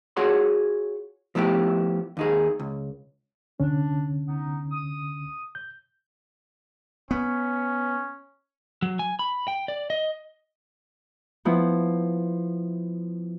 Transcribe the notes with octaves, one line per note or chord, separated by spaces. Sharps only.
F4 F#4 G#4 C#5 F#5 C6
F3 A3 B3 E4 G4
D#2 D#4 G#4
C#2
C2 D3 C#4 D4
B3 D#4
D#6
G6
B3 C#4
F#3
G#5
B5
G5
D5
D#5
F3 B3 E4